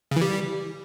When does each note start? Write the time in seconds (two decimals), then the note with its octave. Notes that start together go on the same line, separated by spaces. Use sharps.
0.11 C#3
0.16 E3
0.22 G3